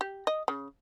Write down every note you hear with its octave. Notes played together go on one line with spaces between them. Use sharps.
G4
D#5
C#3